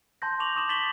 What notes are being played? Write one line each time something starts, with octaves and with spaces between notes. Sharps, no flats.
A5 C6 G6 A#6
C#6 D6 F7 F#7
C#6 D#6 E7 F#7
A6 B6 E7 F#7 G7